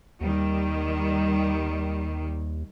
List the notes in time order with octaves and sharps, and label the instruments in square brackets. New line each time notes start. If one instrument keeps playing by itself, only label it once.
[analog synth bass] D#2 [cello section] D#3 G3